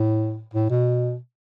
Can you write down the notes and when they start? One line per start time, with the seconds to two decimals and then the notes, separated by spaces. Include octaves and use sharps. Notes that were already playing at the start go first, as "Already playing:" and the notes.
Already playing: A2
0.54 A2
0.70 B2